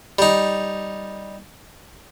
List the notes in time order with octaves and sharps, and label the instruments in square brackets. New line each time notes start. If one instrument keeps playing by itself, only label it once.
[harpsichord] G3 D#4